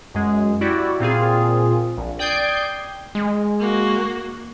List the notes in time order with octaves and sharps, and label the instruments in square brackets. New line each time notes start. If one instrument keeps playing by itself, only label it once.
[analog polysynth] F#2 G#3
E4 F#4 G4 D5
A#2 C4 F4 G#4
A#1
D5 G5 D#6 G6 G#6 C7
[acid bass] G#3
[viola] A#3 F#4